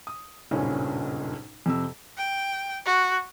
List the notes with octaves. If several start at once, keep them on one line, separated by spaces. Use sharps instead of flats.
D#6
F#1 B1 G2 A#2 C#4
F2 C3 E6
G5
F#4